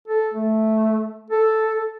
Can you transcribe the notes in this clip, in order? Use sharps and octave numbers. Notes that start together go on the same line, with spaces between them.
A4
A3
A4